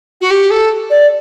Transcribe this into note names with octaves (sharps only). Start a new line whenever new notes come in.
F#4
G4
A4
D5